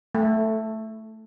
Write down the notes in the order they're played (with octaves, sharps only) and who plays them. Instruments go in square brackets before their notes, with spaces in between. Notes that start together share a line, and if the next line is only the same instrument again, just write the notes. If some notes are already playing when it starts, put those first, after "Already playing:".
[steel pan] A3